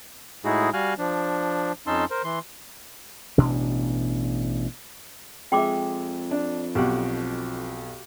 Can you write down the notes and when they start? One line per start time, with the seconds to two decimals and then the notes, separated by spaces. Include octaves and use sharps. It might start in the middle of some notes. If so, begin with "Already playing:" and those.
0.45 A2 G#3 D#4 E4 F#4 G#4
0.73 G3 F#4 F5 G#5 F6 F#6
0.99 F3 D4
1.87 F2 C#4 D#4 A5 C6 E6
2.11 A#4 C5
2.24 E3 C6
3.38 A1 B2 D4
5.52 F2 G#3 E5 G5 C6 D6
6.31 D4
6.75 B1 B2 F#4 G4 F#5